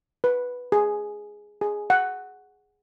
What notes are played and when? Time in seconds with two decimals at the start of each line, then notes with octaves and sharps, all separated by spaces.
0.24 B4
0.72 G#4
1.61 G#4
1.90 F#5